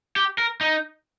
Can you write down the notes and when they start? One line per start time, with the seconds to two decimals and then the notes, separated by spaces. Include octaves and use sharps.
0.16 G4
0.38 A#4
0.61 D#4